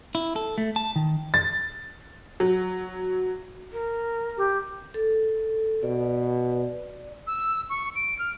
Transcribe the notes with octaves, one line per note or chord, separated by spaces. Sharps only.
E4
A4
A3
A5
D#3
A6
F#3
A#4
G4
A4
B2 D5
E6
C#6
D7
F6